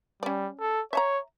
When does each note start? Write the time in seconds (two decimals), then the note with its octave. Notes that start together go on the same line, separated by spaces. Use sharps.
0.23 G3 C#4 D5
0.60 A4
0.93 C#5 E5 A5 A#5